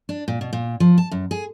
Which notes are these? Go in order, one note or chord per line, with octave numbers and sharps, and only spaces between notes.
D4
A#2
B2
A#2
F3
A5
F#2
G#4